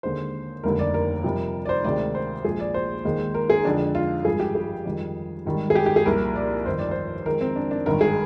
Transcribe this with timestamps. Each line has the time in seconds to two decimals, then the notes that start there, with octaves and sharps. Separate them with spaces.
0.03 D#2 D3 G#3 C5
0.63 F1 D#2 D3 G3 A#4
0.79 D5
0.94 A#4
1.24 F2 C3 G3
1.65 D5
1.69 C5
1.84 D2 C3 D#3 G#3 D5
2.15 C5
2.45 A#1 A#2 F3 G#3 G#4
2.60 D5
2.74 C5
3.05 D#2 D#3 G#3
3.34 A#4
3.50 G#4
3.65 F2 D3 F3 G#3 D4
3.95 F4
4.25 G#1 G2 F3 G#4
4.40 G4
4.55 G#4
4.85 F2 D#3 G3
5.46 G#1 G#2 D#3 G3
5.70 G#4
5.75 G4
5.86 G4
5.96 G#4
6.06 C2 A#2 F3 A#4
6.36 D5
6.66 G1 F2 D#3 C5
6.79 D5
6.91 C5
7.26 F2 D#3 G#3 A#4
7.41 C4
7.56 D4
7.71 D4
7.86 G#1 G2 D#3 A#4
8.01 G#4